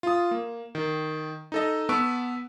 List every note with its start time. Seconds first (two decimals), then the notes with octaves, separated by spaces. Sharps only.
0.03 F4 D#6
0.31 A#3
0.75 D#3
1.52 D#4 A4 D#5
1.89 B3 B4 A5 C#6 E6 D7